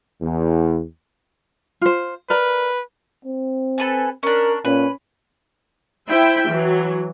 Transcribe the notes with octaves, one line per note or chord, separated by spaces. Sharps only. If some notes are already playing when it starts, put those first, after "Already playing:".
E2
F4 C5
A#4 B4 D5 A#5
C4
A4 B4 G#5
C#4 D4 A#4
A#2 C#4 B4
E4 C5 E5 G5
E3 F#3